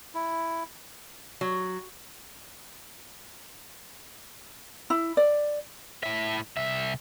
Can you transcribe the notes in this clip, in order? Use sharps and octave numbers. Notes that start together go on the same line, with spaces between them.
E4
F#3
E4
D5
A2 E5
C2 E5